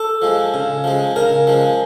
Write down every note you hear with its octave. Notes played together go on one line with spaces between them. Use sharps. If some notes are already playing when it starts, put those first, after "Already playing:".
Already playing: A4
F3 G#3
C#3
F3 G#3
C#3 A#4
F3 G#3